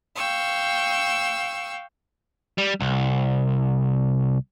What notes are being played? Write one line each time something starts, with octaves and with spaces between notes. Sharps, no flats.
F5 G5 C#6 E6
G3
C2